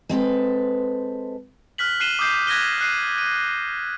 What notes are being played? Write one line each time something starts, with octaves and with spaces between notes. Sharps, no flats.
G#3 C4 A4 B4
F6 F#6 B6 F#7
F#6 C7 D#7 E7 G7
D6 D#6 G6 C7
F#6 G#6 A#6 B6 D#7 G7
F#6 C7 D#7
D#7